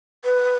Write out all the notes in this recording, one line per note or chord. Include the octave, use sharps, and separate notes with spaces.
B4